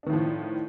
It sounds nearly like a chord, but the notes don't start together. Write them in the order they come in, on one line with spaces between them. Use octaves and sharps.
D4 D#3 A2 F3